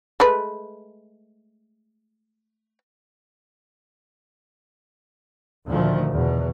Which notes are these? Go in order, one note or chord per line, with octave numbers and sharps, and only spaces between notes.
G#3 A3 B4
D2 A#2 D#3 F3 A3
E2 B2